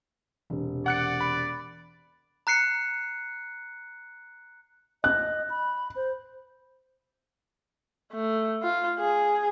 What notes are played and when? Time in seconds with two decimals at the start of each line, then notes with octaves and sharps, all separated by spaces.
0.50 E1 C3
0.86 D5 F#5 F#6 C#7
1.21 B5
2.47 A#5 F#6 C7 C#7
5.04 D#5 F#6
5.50 B5
5.96 C5
8.13 A3
8.63 F4
8.99 G#4